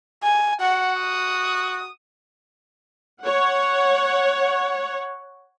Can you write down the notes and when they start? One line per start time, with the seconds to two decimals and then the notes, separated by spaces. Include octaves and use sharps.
0.23 G#5
0.61 F#4 F#5
1.00 D#6
3.22 C#5 F#5